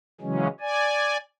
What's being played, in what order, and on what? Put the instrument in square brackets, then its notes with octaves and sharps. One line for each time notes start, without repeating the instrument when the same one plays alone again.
[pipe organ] C#3 E3 F#3 G#3 C#4
D5 G#5